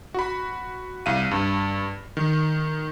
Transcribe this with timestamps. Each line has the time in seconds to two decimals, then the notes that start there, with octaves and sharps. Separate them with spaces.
0.14 F#4 B5
1.06 C2 F5 D#7
1.31 G2
2.17 D#3